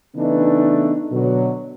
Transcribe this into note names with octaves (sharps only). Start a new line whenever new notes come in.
C#3 E3 A3 B3 D4 D#4
B2 D3 F#3